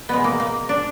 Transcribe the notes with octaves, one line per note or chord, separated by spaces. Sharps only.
B2 G#3 B3
A#3
A#3
D4